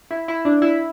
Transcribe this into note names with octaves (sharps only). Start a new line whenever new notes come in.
E4
E4
D4
E4